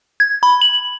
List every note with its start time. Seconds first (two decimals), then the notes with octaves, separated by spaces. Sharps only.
0.20 G#6
0.43 B5
0.61 F#7